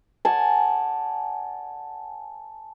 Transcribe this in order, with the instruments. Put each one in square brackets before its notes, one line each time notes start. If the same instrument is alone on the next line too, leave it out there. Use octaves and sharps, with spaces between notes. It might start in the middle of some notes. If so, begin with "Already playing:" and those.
[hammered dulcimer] D5 F#5 G#5 A5